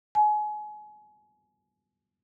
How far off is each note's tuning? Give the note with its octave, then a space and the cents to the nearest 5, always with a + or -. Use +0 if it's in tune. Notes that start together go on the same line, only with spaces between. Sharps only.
G#5 +30